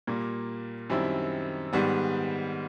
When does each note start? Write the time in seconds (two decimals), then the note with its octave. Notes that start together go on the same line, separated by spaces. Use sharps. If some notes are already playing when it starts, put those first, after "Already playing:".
0.07 A#2 G3 A#3
0.90 F#2 D#3 G3 C4 E4
1.73 G#2 D#3 G3 B3